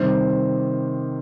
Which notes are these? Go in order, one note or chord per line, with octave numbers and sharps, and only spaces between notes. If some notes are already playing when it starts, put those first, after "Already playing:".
Already playing: C3 D#3 G3 C5